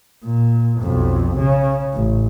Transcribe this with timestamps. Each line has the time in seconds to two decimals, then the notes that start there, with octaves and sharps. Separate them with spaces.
0.24 A#2
0.81 B1 F2
1.38 C#3
1.94 A1